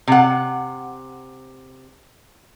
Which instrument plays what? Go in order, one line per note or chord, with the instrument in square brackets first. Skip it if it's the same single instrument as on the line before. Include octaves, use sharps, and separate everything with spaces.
[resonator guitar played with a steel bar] C3 F#5